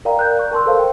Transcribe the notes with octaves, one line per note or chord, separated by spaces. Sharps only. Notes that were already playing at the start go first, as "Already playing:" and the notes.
A#4 D5 F5 G5 A#5
F#6 G6
C#6
A#4 A5 C6 E6
A4 C5 F5
G5